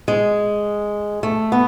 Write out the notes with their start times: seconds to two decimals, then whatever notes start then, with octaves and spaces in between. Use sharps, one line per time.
0.08 G#3
1.23 A3
1.52 B3